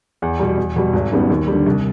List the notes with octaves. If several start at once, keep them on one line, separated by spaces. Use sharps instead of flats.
E2
B2 G3
E2
B2 G3
G#1
F#2 D#3 G3 B3
D#2
D3 G3
C2